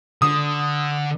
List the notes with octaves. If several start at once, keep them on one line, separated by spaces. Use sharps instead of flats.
D3 D#6